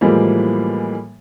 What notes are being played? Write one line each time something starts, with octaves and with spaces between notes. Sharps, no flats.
A2 E3 F3 G3 G#3 A#3